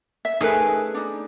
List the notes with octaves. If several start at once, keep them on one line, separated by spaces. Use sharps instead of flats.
E5
A3 C#4 D#4 G#4 A#4 B4
D4 D#4